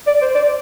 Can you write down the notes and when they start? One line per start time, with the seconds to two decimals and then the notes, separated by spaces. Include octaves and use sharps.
0.07 D5
0.21 C5
0.35 D5